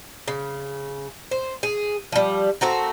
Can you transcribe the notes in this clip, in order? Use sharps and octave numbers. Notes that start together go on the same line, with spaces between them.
C#3
C5
G#4
F3 G3
A3 C4 F#4 A#4